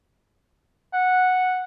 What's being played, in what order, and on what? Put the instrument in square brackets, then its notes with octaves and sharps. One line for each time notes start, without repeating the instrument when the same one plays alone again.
[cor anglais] F#5